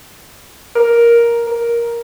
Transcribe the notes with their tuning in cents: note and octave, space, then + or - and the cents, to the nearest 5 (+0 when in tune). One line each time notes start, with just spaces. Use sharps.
A#4 +10
A#4 +5